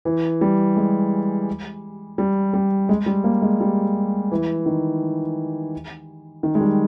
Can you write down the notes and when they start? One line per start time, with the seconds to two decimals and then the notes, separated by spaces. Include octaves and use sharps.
0.05 E3
0.41 G3
0.77 G#3
2.18 G3
2.54 G3
2.89 G#3
3.06 G3
3.24 A#3
3.42 G#3
3.61 G3
4.32 E3
4.66 D#3
6.43 D#3
6.55 G#3
6.61 G3